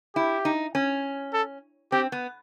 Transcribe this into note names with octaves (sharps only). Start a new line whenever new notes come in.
E4 G4
D#4
C#4
A4
C4 G4
B3